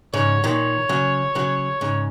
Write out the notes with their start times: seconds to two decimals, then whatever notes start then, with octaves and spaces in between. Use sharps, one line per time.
0.13 G#2 C#3 C#5
0.44 A#2 D#3 C#5
0.89 C#3 F#3
1.35 C#3 F#3
1.81 G#2 C#3